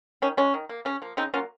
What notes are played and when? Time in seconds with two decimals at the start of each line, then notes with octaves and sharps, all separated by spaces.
0.22 D#3 C#4
0.37 G#3 C#4
0.54 D#3
0.69 A#3
0.85 C#3 C#4
1.02 F3 A#3
1.17 C#3 C4 D#4
1.34 F#3 A#3 C#4 F4